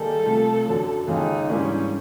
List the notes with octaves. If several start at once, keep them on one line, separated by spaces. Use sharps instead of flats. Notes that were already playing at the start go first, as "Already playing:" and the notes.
Already playing: D#3 G3 A#3 D#4 G#4 A4
C3 F3 A3
F#2 D3 F#3
D#2 C#3 F3 G#3 D#4
G#2 E3 G3 A#3 C#4 D4